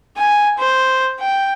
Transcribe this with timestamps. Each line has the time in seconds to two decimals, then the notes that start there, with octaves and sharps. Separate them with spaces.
0.17 G#5
0.58 C5
1.20 G5